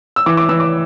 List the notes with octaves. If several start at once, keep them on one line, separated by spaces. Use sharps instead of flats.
E6
E3 D6
D6
E3 E6
D6